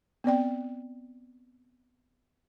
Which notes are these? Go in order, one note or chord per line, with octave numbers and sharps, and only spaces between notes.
B3 C4 D5 G5